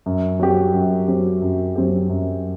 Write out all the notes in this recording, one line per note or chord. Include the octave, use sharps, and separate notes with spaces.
F#2
F#3 C4 G4
F#2
F#3 C4 G4
F#2
F#3 C4 G4
F#2